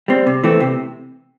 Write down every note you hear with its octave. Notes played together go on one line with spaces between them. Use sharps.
G3 C4
C3
E3 A3 C4
C3